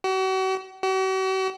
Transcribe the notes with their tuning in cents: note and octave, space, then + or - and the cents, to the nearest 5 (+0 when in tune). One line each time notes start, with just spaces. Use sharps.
F#4 +40
F#4 +45